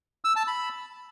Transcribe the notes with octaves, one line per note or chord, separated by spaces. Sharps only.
E6
A5
B5